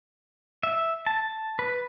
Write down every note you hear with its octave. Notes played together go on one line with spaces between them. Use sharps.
E5
A5
B4